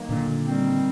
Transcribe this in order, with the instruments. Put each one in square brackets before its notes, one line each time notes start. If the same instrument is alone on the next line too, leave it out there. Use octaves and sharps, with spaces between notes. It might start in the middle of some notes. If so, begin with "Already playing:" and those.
Already playing: [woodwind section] D#3 F#3 A#3
[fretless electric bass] A#2 D3
[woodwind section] D#3 G3 C4